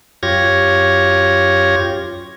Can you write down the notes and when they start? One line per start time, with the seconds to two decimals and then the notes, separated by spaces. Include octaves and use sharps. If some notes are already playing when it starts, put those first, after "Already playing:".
0.23 F#2 F4 G4 C#5 G#6 A#6